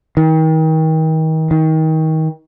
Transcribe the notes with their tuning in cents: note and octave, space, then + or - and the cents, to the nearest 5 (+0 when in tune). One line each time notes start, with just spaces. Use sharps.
D#3 +35
D#3 +30